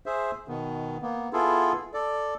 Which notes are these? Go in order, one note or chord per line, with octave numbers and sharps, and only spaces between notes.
G#4 C5 E5
B2 D#3 B3
A#3 B3
B3 E4 F4 G#4 A4
A4 D5